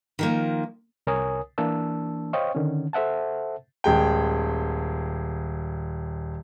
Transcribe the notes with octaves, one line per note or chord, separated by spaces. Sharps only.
D#3 F3 A#3
C2 A#4 C#5 G#5 D#6
E3 A#3 D4 A5 E6
C5 C#5 D#5 F5 G5 C#6
D3 D#3 C#4
A4 C5 E5 F#5 A5
D#1 G#3 G5